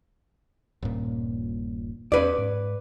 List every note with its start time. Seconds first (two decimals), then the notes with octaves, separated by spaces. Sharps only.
0.82 D#1 G2 A#2
2.12 E2 A#3 C#4 B4 D5
2.38 G#2